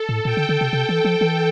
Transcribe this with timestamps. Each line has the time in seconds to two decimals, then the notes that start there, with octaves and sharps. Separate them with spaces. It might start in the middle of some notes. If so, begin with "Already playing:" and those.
Already playing: A4
0.09 A2
0.25 A#2 G5
0.37 D3
0.49 D3
0.61 C3
0.73 C3
0.89 E3
1.04 F3
1.21 E3